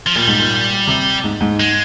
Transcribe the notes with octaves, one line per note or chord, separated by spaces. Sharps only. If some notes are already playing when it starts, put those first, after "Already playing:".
F3
A#2 G3
G#2
A#2
C3
G#2
G#2
G#3